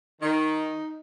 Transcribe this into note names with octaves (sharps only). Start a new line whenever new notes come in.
D#3 D#4